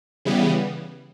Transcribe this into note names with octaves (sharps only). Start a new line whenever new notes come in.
C#3 E3 G3 B3